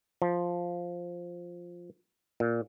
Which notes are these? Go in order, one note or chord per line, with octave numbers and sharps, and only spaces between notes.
F3
A#2